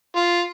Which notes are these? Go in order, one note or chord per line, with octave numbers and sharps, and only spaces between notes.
F4